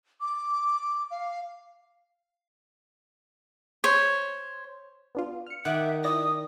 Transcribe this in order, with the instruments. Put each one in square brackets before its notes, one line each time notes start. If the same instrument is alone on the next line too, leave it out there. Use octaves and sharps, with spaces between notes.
[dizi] D6
F5
[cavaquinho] C5 C#5
[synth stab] B3 D4 F4
F6 C#7
[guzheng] D#3 [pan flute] E5 [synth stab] F#5 D6 F#6
[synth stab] E4 D5 A#6 [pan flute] D#6